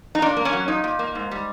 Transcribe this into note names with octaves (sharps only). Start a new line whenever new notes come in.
D#4
A#2 D4
A#3
C#4
F#3
A#2 D#4
A#2
A#3
G#2
G3